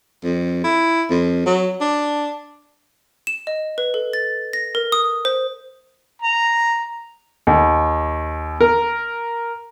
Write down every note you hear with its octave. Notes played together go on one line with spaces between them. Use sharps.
F2
E4
F2
F#3
D4
E7
D#5
B4
A4
A6
A#6
A#4
D#6
C5
A#5
D#2
A#4